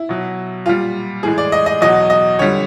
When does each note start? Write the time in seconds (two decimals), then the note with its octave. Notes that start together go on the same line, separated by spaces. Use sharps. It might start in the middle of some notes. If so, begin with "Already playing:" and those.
Already playing: E4
0.09 B2 F#3
0.66 A#2 G3 F4
1.23 A2 E3 G#3 G#4
1.38 D5
1.52 D#5
1.66 D#5
1.81 E2 B2 F#3 D#5
2.10 D#5
2.39 F2 D3 G3 C#5